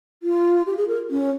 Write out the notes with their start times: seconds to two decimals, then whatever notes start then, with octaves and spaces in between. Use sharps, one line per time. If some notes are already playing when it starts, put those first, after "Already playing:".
0.22 F4
0.66 G4
0.77 G#4
0.88 A#4
1.10 C#4